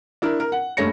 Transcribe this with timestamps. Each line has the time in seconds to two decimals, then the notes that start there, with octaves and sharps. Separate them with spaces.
0.22 D4 E4 A#4
0.40 A#4
0.52 F#5
0.77 F#1 G2 A3 C#5 A#6 C#7